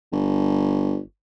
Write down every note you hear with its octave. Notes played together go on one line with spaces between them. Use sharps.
G1